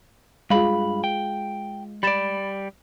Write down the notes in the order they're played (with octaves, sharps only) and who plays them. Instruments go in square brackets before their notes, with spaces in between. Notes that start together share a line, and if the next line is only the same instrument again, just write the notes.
[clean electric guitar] G2 B5 [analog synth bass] G#3 [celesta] F4 G#4 F5
[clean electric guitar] G5
[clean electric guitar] G3 D5 [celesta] B5 A6 E7